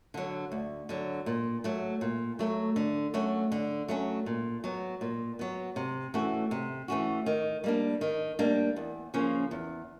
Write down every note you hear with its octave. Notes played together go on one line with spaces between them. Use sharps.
D3 F#3
D2
D3 F#3
A#2
F#3 A3
A#2
F#3 A3
D3
F#3 A3 C#4 F#4
D3
F#3 A3 C#4 F#4
A#2
F#3 B3
A#2
F#3 B3
C3
E3 A3 C#4 F#4
C3
E3 A3 C#4 F#4
D#3
G3 A#3 D4
D#3
G3 A#3 D4
E2
C#3 F3 A#3 C#4
E2